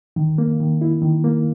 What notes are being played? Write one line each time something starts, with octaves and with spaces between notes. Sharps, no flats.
D#3
A#3
D#3
E4
D#3
A#3